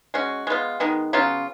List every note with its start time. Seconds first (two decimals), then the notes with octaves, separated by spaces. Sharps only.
0.14 G#3 C#4 F#4
0.47 G#3 B3 F4
0.80 D#3 G#3 B3
1.13 C#3 F#3 B3 F4